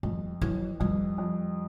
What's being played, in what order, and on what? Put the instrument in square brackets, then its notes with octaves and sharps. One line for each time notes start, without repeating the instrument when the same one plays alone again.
[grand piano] F2 [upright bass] G3
[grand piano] E3 [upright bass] F#3
[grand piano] F2 [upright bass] G3
[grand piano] F2